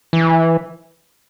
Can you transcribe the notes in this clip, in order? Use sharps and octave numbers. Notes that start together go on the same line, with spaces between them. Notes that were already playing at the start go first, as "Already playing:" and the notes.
E3